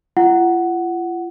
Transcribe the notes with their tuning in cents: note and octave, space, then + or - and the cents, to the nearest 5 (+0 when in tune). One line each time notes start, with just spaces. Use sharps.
F4 -40 F#5 +5